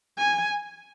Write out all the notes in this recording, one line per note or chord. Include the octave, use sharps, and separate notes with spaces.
G#5